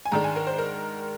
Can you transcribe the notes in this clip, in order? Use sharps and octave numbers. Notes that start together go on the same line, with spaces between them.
G#5
G#2 D#3 G#3 D4 A#5
G#5
A#4
C5
A#4